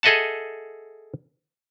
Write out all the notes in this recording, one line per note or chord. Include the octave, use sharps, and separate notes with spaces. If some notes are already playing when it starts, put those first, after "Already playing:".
G#4 A4 D#5 E5 F#5 A5